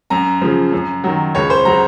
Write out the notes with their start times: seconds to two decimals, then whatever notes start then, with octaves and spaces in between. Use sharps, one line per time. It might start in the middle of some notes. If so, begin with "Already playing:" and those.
0.10 F#2 A#5
0.42 C#3 F3
0.73 F#2
1.04 D#3 F#3
1.35 C#2 C#5
1.50 C5
1.65 C#3 F#3 A#5